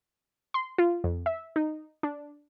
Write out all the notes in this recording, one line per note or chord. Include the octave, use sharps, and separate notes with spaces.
C6
F4
F2
E5
D#4
D4